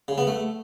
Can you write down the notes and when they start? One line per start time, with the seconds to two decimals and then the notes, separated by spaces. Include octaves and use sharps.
0.08 C#3
0.18 B3
0.27 A3